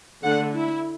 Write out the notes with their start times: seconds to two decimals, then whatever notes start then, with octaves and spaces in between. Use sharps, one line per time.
0.23 D3 A3 D4 F#5
0.54 E4